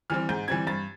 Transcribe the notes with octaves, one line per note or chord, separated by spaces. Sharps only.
E3 G3 C4 F6
G#2 G6
E3 G3 C4 G#6
G2 A6